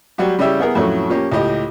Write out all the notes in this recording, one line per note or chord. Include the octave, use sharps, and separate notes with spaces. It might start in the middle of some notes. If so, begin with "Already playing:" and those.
F#3 G3 F#4 G4
C#3 G3 C#4 E4 G4 E5
B3 E4 G#4 A#4
F2 A2 F#3 A3 C#4
F3 A#3 C#4 G4
C#2 A2 G4 D#5